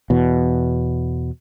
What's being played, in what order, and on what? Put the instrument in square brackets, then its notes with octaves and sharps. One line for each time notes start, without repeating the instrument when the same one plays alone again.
[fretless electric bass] E2 B2